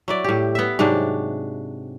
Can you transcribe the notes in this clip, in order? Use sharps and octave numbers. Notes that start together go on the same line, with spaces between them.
F#3 E4 D5
A2 G4
B3 E5
G#2 C3 F#3 D4